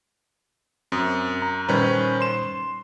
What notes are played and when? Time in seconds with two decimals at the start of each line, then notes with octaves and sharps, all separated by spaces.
0.92 F#2 C4 D#6
1.42 A#5
1.68 A#2 D#3 G3 C#4 B4 C5
2.21 C6 E7